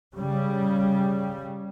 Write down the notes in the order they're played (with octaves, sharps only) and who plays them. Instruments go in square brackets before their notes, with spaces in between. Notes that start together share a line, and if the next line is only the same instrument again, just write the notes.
[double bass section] C#3 G3